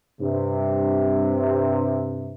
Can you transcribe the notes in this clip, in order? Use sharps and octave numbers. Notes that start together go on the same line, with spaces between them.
G2 C3